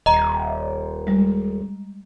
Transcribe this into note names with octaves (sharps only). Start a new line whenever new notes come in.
D#1 D#5 A#5
G3 G#3